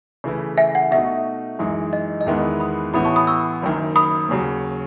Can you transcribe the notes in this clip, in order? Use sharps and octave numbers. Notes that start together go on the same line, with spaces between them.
C#3 E3 A3 E4 B4
E5 G#5
F#5
B2 A3 D#4 F#4 E5
F#2 E3 G#3 D#4
D#5
D#5
E2 D#3 G#3 B3 E4 E5
B5 D#6
A1 A2 E3 B3 B5 D#6
A5 C#6
B5 D#6
C#6 E6
F#1 F#2 D#3
B5 D#6
D#2 C#3 F#3